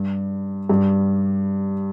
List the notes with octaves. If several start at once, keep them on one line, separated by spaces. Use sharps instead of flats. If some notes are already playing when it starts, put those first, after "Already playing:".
Already playing: G2 G3
G2 G3